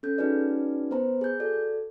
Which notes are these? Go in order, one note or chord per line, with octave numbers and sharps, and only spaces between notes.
C#4 A4 G6
C#4 D#4 F#4 G#4 B4 D5
B3 B4 C5 A#5
G#4 G6
F#4 A4 D5